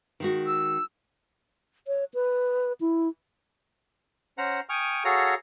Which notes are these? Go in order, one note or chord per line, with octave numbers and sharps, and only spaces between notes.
D#3 G#3 F#4
E6
C#5
B4
E4
C#4 C5 F#5 A#5
G5 G#5 C#6 D#6 F6
F#4 G#4 A4 C#5 F5 A#5